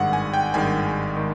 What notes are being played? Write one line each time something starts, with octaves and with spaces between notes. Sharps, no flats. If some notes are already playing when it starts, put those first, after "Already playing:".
Already playing: G#1 G2 D#3 G#3 F#5
G#5
G5
G#1 G2 D#3 G#3 G#5
D#3 G#3